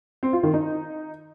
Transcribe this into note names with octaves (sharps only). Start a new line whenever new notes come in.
C4
F4
D#3
D#4